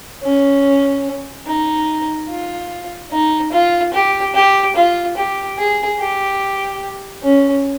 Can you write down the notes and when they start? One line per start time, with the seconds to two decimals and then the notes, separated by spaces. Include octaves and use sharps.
0.23 C#4
1.47 D#4
2.29 F4
3.11 D#4
3.52 F4
3.93 G4
4.35 G4
4.76 F4
5.17 G4
5.58 G#4
6.00 G4
7.23 C#4